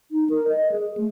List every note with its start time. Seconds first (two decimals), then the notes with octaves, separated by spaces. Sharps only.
0.11 D#4
0.30 A#4
0.48 D#5
0.71 G#4
0.97 A3